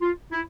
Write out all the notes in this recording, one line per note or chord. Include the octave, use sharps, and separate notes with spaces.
F4
E4